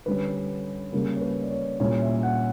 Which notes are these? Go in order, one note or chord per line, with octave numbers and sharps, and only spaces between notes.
D3 G3 C#4 B4
C#3 G3 A#3 A#4
C#5
B4
D5
C#5
A#2 G3 A#3 C#4 E4 C#5
E5
F#5